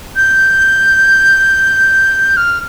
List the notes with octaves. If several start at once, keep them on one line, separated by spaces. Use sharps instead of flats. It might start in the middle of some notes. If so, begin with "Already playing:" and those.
G6
F6